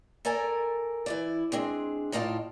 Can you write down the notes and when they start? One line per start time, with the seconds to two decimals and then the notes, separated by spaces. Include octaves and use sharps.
0.25 A4 A#4 D5 G#5 A#5
1.06 E3 E4 D5
1.52 G#3 C4 D4 G#4
2.12 A2 D#4 F4 D5 A5